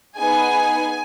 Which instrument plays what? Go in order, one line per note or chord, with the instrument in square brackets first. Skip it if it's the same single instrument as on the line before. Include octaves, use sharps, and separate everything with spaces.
[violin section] B3 D#4 G#4 G#5